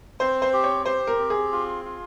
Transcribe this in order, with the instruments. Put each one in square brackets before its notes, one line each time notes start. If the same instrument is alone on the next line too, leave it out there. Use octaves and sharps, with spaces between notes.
[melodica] C4 [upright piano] C5
[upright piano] C5
[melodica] G4
[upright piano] C#5
[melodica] G4 [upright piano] C5
[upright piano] A#4
[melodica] C4
[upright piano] G#4
[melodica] F4
F4